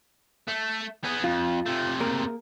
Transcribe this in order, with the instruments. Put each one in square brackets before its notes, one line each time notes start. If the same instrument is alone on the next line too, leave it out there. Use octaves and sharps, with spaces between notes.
[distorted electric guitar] A3
B3 G#4
[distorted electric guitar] F2 [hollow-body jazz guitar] F4
[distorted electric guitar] C3 A3
[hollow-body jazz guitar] A#3 G#4 A#4